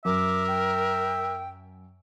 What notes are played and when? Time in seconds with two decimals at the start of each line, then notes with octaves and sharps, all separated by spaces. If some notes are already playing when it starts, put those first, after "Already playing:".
0.05 F#2 A#4 E5 D6
0.48 G5